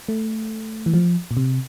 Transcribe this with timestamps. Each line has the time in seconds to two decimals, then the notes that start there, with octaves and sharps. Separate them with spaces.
0.09 A3
0.86 E3
0.94 F3
1.31 A#2
1.37 C3